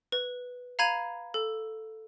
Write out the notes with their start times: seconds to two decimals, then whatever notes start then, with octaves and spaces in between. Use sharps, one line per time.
0.12 B4
0.79 F5 A#5 B5 G#6 D#7 F7
1.34 A4